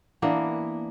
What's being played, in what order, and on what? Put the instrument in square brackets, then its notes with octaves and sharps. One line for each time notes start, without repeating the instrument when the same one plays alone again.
[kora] E3 A#3 B3 D4